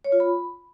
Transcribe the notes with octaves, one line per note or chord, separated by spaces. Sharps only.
C#5
F4
B5